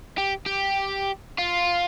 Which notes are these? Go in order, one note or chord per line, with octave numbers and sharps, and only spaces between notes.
G4
G4
F4